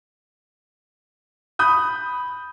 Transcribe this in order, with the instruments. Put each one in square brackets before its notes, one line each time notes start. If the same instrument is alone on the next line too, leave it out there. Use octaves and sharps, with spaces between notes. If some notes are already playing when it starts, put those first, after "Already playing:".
[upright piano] B5 D#6 G6